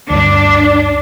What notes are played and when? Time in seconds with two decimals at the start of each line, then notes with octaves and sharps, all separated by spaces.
0.10 D2 G2 D4